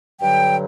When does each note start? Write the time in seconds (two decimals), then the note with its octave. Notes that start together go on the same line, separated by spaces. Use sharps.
0.22 G2 D3 F#3 G5